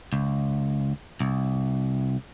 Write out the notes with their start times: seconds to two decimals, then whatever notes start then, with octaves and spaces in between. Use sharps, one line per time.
0.13 C#2
1.20 C2